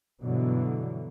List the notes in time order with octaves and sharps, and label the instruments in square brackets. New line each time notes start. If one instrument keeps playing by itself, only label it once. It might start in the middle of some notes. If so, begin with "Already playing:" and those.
[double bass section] G2 B2 D3 E3 F#3